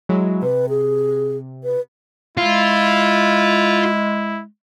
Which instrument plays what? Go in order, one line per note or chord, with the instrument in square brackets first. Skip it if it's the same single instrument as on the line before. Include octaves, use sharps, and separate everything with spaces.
[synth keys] F#3 G#3 E4
[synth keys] C3 [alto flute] B4
[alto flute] G#4
B4
[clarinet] G#3 [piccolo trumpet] E4 [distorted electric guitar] F4